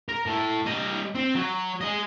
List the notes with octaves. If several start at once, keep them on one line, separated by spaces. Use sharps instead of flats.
A#4
A2
G3 D#5
C4
F#3
G#4 D#5